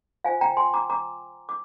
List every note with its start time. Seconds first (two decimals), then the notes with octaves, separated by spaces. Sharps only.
0.24 F4 C5 F5 G#5
0.41 G5 A#5
0.57 G#5 C6
0.74 A#5 D6
0.90 A#5 D6
1.49 D6